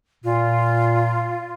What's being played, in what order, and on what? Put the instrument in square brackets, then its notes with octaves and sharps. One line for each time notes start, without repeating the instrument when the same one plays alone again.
[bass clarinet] A#2 [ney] F4